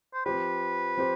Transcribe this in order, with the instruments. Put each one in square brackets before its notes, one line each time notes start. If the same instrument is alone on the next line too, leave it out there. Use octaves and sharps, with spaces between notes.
[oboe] C5
[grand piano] F3 C4 G4 C5 [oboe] B4
[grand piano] F3 C4 G4 C5